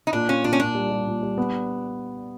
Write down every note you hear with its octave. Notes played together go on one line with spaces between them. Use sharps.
D#4
A#2 D4
C#4 F4
A#2 D4
C#4
A#2 D4
G3
G3
A#2
G3
B3